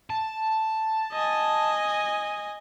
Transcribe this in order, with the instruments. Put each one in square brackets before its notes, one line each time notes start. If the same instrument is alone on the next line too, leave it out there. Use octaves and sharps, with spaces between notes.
[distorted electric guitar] A5
[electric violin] D#5 G#5